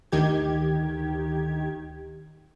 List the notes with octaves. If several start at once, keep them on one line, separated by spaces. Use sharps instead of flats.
D2 D#3 G4 G#6